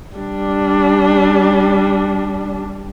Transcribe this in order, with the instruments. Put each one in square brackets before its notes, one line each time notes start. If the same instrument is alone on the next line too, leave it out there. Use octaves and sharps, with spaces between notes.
[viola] G3 D4